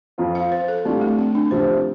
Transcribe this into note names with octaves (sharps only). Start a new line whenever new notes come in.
F2 F3 C4 F4
F5
C5
A4
A2 G3 C4 D4 F4
A3
C4
D4
C2 C3 F3 C4 C5